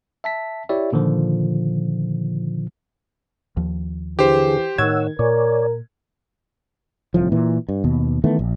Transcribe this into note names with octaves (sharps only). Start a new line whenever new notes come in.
E5 A5 B6
E4 G4 C#5 D5 E5
A#2 D3 D#3 F3
D#2 F3
D3 E3 G4 G#4 C5
A2 D#3 C#5 F#5 E6 G#6
A#2 A#4 C#5 D5 G#5
D1 C2 A2 F3
A#2 E3
G2
D#2 B2
D#3 E3 A3 B3
A#1